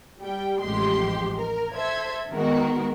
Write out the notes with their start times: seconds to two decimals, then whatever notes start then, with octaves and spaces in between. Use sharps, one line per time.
0.20 G3 G5
0.61 A1 F2 F3 G#3 G4 C6
1.36 A#4
1.75 A4 C5 E5 G#6
2.31 D#3 G#3 B3 F#4 A#4